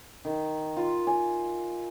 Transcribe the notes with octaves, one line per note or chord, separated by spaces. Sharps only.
D#3
F4
G#5